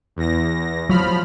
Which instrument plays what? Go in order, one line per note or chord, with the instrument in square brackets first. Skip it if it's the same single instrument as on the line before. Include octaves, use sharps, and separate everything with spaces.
[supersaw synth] E2 A#6
[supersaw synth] F3 B5 F6 [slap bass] F#3